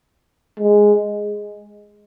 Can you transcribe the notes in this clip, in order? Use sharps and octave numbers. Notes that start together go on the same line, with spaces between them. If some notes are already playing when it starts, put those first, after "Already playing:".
G#3